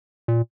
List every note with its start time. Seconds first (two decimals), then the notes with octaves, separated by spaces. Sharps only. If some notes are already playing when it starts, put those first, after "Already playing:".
0.28 A#2